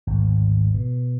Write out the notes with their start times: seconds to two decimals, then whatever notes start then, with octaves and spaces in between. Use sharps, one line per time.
0.07 G#1 D2
0.74 B2